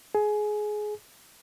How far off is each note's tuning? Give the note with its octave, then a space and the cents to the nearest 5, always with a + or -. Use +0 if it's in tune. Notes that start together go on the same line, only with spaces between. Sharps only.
G#4 +20